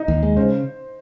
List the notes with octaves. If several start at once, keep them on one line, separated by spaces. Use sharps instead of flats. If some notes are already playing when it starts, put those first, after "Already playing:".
Already playing: D#4
D#2
G#3
C#3 C5